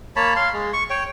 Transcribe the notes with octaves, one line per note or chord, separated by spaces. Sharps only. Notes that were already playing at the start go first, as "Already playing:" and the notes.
A#3 C#5 A5 B5
F5 C6
G#3
C#6
C#5 G5